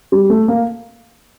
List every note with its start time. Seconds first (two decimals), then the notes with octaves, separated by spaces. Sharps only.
0.12 G3
0.30 A3
0.48 A#3